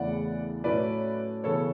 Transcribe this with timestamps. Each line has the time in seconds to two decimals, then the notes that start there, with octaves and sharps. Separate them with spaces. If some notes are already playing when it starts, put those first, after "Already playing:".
Already playing: E2 C#3 E3 A3 E4 D5 F#5
0.64 A2 F#3 A3 C#4 B4 D5
1.44 C#3 E3 B3 A4 C#5